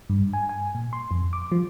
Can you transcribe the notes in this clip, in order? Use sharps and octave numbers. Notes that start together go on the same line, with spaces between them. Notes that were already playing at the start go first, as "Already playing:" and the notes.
G2
G#5
G#5
A#2
C6
F2
D6
F3